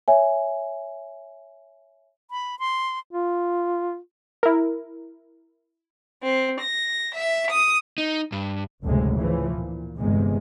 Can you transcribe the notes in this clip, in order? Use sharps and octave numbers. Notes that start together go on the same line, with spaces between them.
C#5 E5 G#5
B5
C6
F4
E4 A#4
C4
A#6
E5
D#6
D#4
G2
F#1 D2 A2 C3 G#3
C#3 E3 F3
A#2
G1 E2 C3 G#3